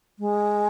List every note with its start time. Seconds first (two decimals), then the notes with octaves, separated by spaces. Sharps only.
0.19 G#3